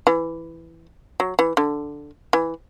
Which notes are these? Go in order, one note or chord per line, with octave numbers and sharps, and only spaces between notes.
E3
F#3
E3
D3
E3